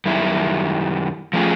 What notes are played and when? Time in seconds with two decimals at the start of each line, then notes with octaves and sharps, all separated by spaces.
0.05 F#2 D#3 G3 E4
1.33 F3 A3 C#4 F4 G#4